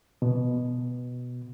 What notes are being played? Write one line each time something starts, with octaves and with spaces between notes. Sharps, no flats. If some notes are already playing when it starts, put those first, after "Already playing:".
B2